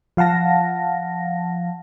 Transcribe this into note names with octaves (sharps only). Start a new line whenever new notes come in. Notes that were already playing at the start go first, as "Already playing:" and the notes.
F3 F5 F#5 A5 A#6